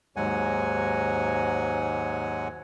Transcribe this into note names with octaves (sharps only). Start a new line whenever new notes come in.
D#2 G#2 F#3 G#3 F#5 G#5